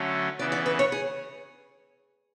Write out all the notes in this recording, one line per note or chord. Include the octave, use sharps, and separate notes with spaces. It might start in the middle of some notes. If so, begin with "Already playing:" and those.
Already playing: D3 F#3 A3 C#4
C#3 E3 B3 D5
D5
B4
C#5
G#4